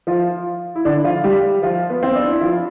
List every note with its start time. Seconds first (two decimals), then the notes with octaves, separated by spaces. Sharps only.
0.07 F3 F4
0.75 E4
0.85 D3 D4
1.04 F3 F4
1.24 G3 G4
1.62 F3 F4
1.90 B3
2.03 C4
2.15 D4
2.29 E4
2.41 F3 F4